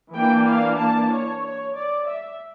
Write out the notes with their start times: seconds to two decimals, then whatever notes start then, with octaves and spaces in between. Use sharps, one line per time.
0.14 E3 A#3 D4 G5
0.47 F5
0.79 A5
1.11 C#5
1.44 C#5
1.76 D5
2.07 E5